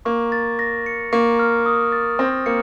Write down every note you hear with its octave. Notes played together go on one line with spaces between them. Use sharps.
A#3 C#6
A6
A#6
C#7
A#3 C#6
F6
D#6
A6
C4 A#6
A#3 C#7